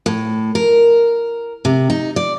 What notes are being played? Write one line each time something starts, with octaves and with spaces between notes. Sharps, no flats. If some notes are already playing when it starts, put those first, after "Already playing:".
A2
A#4
C3
D#4
D5